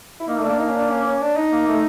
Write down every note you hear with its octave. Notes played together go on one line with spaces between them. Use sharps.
E4
A#3 D#4
A3
A#3 D4
D#4
C#4
D4
C#4
C#4
D4
D#4
A#3
A3